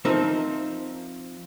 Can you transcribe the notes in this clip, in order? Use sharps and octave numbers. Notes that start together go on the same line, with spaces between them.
F3 C4 D#4 A#4 E5